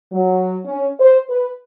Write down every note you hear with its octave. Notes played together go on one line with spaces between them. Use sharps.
F#3
C#4
C5
B4